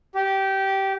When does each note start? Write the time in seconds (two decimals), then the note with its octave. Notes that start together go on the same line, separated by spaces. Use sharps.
0.15 G4